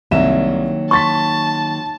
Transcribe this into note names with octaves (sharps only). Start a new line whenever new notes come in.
C2 D#3 F#3 A#3 E5 E7
A5 C6 C#6 A6 B6